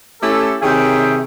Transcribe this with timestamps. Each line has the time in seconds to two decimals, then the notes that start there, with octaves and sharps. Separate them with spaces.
0.21 A3 C#4 E4 G4 A4
0.62 C3 D#3 G#4 C#5 E5 G5